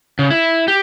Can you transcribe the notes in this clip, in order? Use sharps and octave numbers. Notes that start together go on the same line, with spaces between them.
C#3
E4
G4